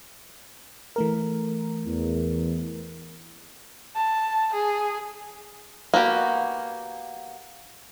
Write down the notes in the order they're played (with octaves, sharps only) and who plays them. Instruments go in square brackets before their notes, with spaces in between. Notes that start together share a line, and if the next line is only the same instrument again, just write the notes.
[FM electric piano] E3 A3 A#4
[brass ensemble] E2
[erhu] A5
G#4
[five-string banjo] A#3 B3 F#4 G4